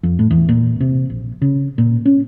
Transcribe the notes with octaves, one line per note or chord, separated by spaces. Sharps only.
F2
A2
E2
A#2
C3
A#1
C#3
A#2
C#4